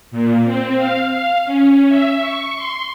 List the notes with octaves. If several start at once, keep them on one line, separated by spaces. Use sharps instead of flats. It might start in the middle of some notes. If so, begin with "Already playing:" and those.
A#2
C4
F5
F5
C#4
E5
C#6
C6